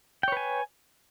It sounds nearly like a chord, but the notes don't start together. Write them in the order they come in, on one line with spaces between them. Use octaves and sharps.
G5 C#5 B4 G#5